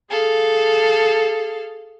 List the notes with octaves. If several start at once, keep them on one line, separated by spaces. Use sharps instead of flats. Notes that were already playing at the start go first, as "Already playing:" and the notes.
G#4 A4 F5